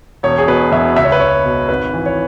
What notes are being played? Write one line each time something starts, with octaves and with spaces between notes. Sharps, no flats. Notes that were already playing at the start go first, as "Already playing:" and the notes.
E1 C#5
G#4
B2 B4
E2 E5
C#2 E5
C#5
B4
C#2 C#5
B2
G#1 B4
E3
C#5